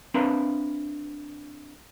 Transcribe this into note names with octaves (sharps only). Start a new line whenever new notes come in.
C4 D4 A#4 B4 E5 F5